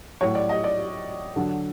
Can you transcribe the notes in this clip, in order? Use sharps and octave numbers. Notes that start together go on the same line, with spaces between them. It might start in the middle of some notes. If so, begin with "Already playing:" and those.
A2 F#3 C#5
D5
D#5
D5
D3 F#3